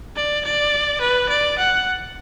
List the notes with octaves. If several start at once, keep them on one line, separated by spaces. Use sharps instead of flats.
D5
D5
B4
D5
F#5